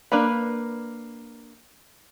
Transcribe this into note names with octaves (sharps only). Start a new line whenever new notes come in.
A#3 D4 B4 A#5 B5